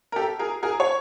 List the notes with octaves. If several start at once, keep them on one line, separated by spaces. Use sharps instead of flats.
A#4
G4 A4
G#4 A#4
G#4 A#4
C#5